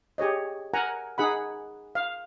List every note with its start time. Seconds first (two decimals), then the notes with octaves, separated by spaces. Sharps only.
0.18 G4 G#4 C#5 D#5
0.74 A#4 F#5 G#5 A#5
1.18 D#4 G#4 F#5 B5
1.95 F5